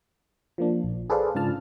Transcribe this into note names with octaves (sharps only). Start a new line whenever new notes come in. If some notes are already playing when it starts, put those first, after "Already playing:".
F3 A#3 D4
A#1
G#4 A4 B4 C5 D5 F5
G#2 C#3 D4 F4 A5 F6